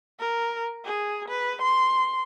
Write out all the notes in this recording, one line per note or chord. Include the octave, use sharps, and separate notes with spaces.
A#4
G#4
B4
C6